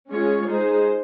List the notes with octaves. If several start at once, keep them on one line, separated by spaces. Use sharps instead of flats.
G#3 C#4 F4 G#4 C#5
G#3 D#4 G#4 C5